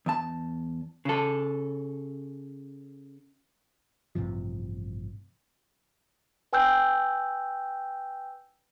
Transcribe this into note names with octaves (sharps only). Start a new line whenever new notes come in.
E2 A5
C#3 A4
A1 G2 C3 F3
B4 G5 G#5 E6 F#6 G6